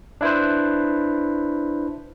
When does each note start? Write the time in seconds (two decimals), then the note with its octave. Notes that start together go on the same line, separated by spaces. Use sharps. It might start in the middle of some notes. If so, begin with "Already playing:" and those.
0.21 D4 E4 B4 C5